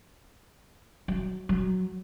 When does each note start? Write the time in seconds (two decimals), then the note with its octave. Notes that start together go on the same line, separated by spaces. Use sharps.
1.08 F#3
1.49 F#3